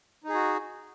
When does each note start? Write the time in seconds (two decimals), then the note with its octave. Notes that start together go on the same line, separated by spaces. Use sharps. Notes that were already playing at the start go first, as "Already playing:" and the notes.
0.24 D#4
0.29 G#4
0.34 F#4